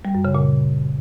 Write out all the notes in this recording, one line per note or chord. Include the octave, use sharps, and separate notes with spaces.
G3
F#2
C#3
A#2